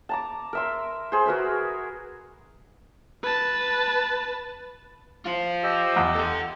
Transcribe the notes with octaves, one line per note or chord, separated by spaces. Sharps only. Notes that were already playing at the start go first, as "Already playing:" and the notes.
A5 A#5 D6
A#4 E5 C6
G#4 C5
F#4 A#4 B4 E5
B4 A5
F4 C5
G4 D#5 E6
E2
A4 F#5